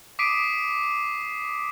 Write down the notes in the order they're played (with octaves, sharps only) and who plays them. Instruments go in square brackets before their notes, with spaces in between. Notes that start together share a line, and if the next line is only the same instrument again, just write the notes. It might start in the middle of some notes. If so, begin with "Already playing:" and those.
[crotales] D6 D#6 B6 C7 D7 D#7